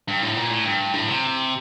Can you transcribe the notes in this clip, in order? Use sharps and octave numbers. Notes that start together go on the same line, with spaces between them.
G2
A2
A#2
A2
G2
A2
C3